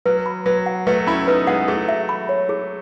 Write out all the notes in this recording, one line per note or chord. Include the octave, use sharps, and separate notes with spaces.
F#3 B4
B5
F#3 B4
F#5
F#3 A3 B4
C#4 E4 B5
B3 D#4 B4
G#3 B3 F#5
F#3 A3 G#4
E5
B5
C#5
G#4